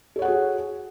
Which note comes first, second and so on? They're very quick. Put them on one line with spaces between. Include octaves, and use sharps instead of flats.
A4 C#5 F#5 G#4 F#4